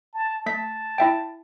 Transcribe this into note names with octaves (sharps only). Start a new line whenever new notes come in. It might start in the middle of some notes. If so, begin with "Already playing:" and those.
A5
A3 A5 B6
E4 E5 G5